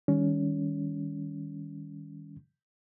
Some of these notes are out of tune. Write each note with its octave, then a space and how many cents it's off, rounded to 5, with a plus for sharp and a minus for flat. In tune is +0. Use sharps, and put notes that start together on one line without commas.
D#3 +10 G3 +30 C#4 +25